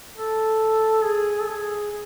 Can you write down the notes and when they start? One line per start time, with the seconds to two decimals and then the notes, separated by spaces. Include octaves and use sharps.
0.17 A4
1.04 G#4
1.40 A4
1.49 G#4